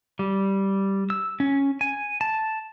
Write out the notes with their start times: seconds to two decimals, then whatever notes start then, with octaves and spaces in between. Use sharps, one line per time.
0.19 G3
1.10 E6
1.40 C#4
1.81 G#5
2.21 A5